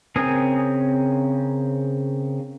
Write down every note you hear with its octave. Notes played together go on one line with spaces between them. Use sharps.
C#3 C4 A#4 G#5 D#6